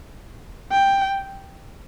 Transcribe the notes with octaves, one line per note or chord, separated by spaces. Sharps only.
G5